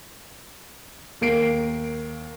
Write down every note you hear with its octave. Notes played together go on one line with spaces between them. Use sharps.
D#2 A#3 C7 D7